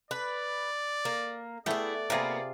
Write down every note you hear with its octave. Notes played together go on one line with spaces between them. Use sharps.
B4 D5
A#3
A3 B3 E4 G#4 D5 G5
C3 A#3 B3 F4 G#4